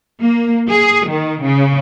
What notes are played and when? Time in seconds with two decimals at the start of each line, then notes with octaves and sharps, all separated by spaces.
0.21 A#3
0.70 G#4
1.09 D#3
1.42 C#3